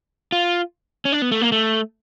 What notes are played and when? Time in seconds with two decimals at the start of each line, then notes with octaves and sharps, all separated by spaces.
0.32 F4
1.05 C#4
1.12 D4
1.22 B3
1.32 A3
1.41 A#3
1.52 A3